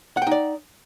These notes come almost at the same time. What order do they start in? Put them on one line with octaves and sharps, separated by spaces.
F#5 G5 D#4 D5